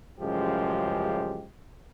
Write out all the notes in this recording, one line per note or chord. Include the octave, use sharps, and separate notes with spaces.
A1 F#2 C#3 F3 G#3 G4